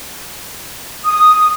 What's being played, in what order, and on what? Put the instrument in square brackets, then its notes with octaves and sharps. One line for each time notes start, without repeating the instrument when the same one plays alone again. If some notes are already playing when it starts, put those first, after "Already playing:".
[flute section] D#6